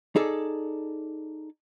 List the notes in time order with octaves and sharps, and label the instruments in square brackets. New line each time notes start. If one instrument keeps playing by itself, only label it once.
[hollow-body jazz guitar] D#4 G#4 A4 D5